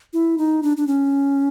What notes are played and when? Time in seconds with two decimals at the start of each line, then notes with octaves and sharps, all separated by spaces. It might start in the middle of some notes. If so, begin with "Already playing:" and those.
0.13 E4
0.38 D#4
0.63 D4
0.77 D4
0.87 C#4